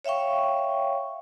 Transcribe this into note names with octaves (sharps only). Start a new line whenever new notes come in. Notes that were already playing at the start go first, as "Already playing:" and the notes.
C#5 E5 F5 G5 C#6